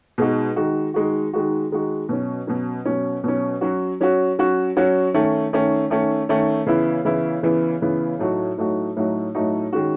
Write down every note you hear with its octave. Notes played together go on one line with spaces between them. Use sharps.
B2 G#3 D#4 F#4
D#3 G#3 D#4 F#4
D#3 G#3 D#4 F#4
D#3 G#3 D#4 F#4
D#3 G#3 D#4 F#4
B2 F#3 C#4
B2 F#3 C#4
B2 F#3 C#4
B2 F#3 C#4
F#3 C#4 F#4
F#3 C#4 F#4
F#3 C#4 F#4
F#3 C#4 F#4
D#3 A3 C#4
D#3 A3 C#4
D#3 A3 C#4
D#3 A3 C#4
C#3 E3 B3 E4
C#3 E3 B3 E4
C#3 E3 B3 E4
C#3 E3 B3 E4
A2 F#3 A3 D#4 F#4
A2 F#3 A3 D#4 F#4
A2 F#3 A3 D#4 F#4
A2 F#3 A3 D#4 F#4
D#3 G#3 C#4 F#4